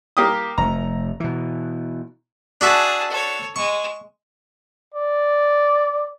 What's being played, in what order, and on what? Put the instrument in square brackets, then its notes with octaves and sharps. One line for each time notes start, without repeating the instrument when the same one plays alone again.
[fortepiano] A#3 G4 D#6
[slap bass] F1 A3 [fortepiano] A#5
[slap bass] B2 E3
[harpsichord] D4 F#4 E5 [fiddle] G#4 A5
[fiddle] A4 C#5
[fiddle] G#3 [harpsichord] C#6
[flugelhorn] D5